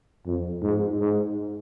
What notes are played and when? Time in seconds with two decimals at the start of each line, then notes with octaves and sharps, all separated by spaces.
0.26 F2
0.63 G#2
0.99 G#2